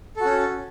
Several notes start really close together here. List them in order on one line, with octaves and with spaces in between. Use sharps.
A4 F#4 C#4